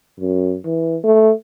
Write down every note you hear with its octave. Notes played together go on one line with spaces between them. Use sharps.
F#2
E3
A3